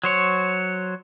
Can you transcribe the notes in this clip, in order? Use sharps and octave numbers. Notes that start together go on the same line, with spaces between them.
F#3 C5 C#5